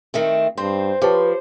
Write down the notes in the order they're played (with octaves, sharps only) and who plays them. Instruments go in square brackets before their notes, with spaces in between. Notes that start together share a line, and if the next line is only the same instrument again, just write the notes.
[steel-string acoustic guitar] D#3 A3 C4
[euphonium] G2 [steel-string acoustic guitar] C4 [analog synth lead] C5
[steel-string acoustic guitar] F3 [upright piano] G4 C#5 A5 [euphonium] B4